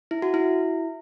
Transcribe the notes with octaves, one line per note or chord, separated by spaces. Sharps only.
E4
F#4
E4